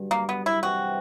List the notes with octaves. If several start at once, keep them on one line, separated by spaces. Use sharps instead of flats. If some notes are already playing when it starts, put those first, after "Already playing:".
Already playing: G2 D3 F#3
A#3
B3
E4
C3 E3 G3 C4 F#4